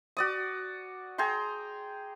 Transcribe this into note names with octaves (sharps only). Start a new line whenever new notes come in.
F#4 D5 D#6
G#4 G5 A#5 C6